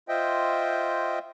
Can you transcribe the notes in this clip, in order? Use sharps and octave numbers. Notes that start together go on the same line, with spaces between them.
F4 C5 D#5 E5 G5